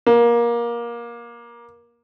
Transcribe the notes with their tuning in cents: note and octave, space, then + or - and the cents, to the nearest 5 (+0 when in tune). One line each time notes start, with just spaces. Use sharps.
A#3 +20